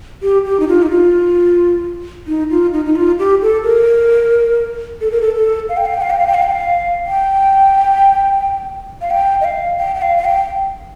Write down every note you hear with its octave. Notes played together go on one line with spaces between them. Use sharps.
G4
G4
D#4
F4
D#4
F4
D#4
F4
D#4
D#4
F4
G4
A4
A#4
A4
A#4
A4
A4
F5
G5
F5
G5
F5
G5
F5
G5
F5
G5
F5
G5
F5
G5
D#5
F5
G5
G5
F5
F5
G5